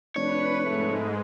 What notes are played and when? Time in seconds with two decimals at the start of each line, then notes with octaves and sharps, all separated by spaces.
0.16 F1 D4 B4 C#5
0.65 G#2 G#3 A3